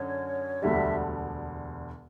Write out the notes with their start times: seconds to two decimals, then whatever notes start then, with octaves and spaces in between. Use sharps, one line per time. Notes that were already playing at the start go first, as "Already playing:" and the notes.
Already playing: F#2 D3 C#4 C#5
0.62 E1 D2 D3 G3 E5